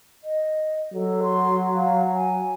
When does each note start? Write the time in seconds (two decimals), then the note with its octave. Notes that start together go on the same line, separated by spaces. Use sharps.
0.24 D#5
0.94 F#3 A4
1.23 C6
1.75 F5
2.14 G#5